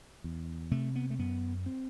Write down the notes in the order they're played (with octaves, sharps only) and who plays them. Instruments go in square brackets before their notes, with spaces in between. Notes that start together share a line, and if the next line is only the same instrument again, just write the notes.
[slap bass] E2
C3 A3
B3
A3
F#2 B3
C4